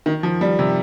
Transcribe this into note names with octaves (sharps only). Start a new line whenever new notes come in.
D#3
F3
G3
C3